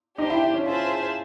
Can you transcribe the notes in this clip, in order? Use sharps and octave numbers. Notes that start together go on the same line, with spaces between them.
D4 D#4 G4 C5
E4
E4
C#4
F4 G#4 C5 E5 A5